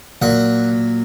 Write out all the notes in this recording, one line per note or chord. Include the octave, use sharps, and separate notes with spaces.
A#2 F#3 F#5